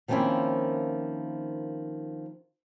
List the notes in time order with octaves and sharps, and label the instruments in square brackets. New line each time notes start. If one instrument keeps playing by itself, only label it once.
[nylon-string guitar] D#3 F3 A#3 C4 C#4 E4